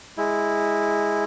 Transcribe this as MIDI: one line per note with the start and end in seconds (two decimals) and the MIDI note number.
0.18 1.24 56
0.18 1.24 64